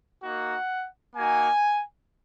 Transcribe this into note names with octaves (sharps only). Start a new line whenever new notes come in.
A#3 D#4 F#4 F#5
A#3 D#4 F#4 G#5